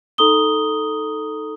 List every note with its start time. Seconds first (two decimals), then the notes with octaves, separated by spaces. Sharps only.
0.18 D#4 A4 A#5 C#6 D#6 G7